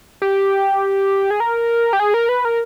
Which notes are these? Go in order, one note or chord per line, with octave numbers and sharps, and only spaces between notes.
G4
G#4
A#4
G4
G#4
A#4
B4
A#4